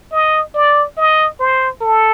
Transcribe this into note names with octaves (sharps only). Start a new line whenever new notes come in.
D#5
D5
D#5
C5
A4